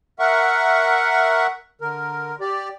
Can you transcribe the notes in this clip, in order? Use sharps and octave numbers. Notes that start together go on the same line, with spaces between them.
A#4 E5 F#5 C#6
D3 A#4
G4 D5